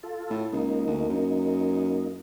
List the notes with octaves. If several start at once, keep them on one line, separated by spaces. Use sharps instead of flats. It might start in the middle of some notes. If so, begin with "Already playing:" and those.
F4 A4
A2
C#2 A#3 D#4
D2
F#2